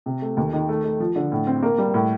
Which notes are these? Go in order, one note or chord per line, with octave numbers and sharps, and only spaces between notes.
C3
A3
D#2
D#3
A3
A3
F3
D3
A2
C4
A#3
G3
A2